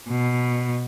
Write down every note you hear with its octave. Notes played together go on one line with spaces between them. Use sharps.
B2